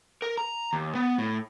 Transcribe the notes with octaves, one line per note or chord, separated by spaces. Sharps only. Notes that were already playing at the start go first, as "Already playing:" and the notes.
A#4
A#5
D#2
B3
A2